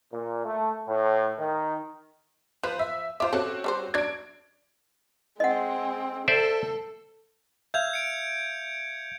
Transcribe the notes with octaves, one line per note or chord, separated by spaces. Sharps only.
A#2
A3
A2
D#3
F3 B4 C5
E5
F4 C5 E5 D6
C4 C#4 F#4 A4
G3 A4 C5
F#3 D4 D5 G#6 D7
G#3 C4 D#5 F#5
A4 C5 D5 E5
E5 F5 G6 G#6 F7
C#7 D7